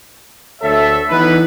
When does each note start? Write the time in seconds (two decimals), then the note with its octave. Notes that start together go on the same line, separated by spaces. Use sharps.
0.61 D2 A4 C#5 E5
1.09 E3 B3 D#4 B4